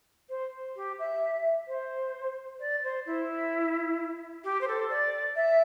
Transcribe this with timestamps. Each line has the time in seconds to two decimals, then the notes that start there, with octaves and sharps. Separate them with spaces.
0.30 C5
0.76 G4
0.99 E5
1.68 C5
2.60 D5
2.84 C5
3.06 E4
4.44 G4
4.61 C5
4.68 A4
4.90 D5
5.36 E5